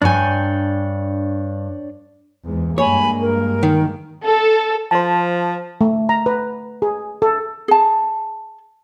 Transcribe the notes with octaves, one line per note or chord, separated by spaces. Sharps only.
G2 D4 C#5 G5 G#5
E2 G#2
G2 G#3 A#3 C#5 G#5 B5
A#4
D#3
A4
F3 C5 A5
A3
A#5
B4
G#4
A4
G#4 A5